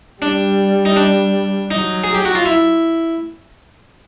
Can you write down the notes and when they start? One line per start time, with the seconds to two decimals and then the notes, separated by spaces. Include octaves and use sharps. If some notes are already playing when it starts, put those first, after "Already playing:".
0.22 G3 D4
0.85 D#4
0.96 D4
1.71 F#3 D#4
2.04 G#4
2.15 G4
2.25 F#4
2.35 F4
2.46 E4